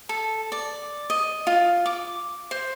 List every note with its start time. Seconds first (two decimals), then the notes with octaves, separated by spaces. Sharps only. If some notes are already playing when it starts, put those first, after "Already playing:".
0.09 A4
0.52 D5
1.10 D#5
1.47 F4
1.86 D6
2.51 C5